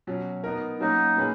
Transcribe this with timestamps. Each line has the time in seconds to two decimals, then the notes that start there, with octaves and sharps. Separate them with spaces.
0.07 B2 F#3 C#4
0.44 B3 D#4 A#4
0.80 F#3 A#3 C#4 D#4 F#4
1.16 B2 A#3 C#4 G#4 B4